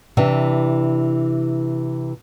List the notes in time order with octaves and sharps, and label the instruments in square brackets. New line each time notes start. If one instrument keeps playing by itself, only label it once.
[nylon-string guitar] C3 E3 D4